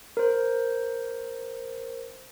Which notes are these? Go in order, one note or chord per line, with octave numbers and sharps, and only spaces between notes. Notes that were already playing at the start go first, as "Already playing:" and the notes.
A#4 C5